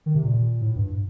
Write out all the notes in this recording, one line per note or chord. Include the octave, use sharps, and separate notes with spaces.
D#3
C3
A#2
A2
G2